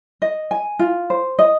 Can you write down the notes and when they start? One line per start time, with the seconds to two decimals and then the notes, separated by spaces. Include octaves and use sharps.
0.22 D#5
0.51 G#5
0.79 F4
1.10 C5
1.39 D#5